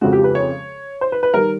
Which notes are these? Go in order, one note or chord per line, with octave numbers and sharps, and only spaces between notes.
F2 C#3 F3 G#3 F#4
G4
B4
C#5
C5
B4
B4
D#3 G3 A#4